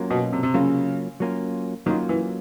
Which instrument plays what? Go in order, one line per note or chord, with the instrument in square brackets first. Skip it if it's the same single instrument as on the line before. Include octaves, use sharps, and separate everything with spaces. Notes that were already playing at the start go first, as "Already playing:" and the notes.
Already playing: [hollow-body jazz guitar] F#3 A#3 C#4 F4
[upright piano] B2
C3
C3
[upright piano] C#3 [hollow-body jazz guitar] F#3 A#3 C#4 F4
[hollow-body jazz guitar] F#3 A#3 C#4 F4
[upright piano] D#3 [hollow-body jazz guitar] F#3 A#3 C#4 F4
[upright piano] E3